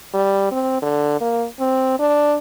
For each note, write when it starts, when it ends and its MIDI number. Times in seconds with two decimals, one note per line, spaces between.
0.14 0.49 55
0.52 0.77 60
0.82 1.20 50
1.21 1.45 58
1.60 1.96 60
1.99 2.36 62